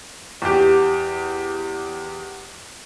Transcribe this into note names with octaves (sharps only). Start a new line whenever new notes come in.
E2 G4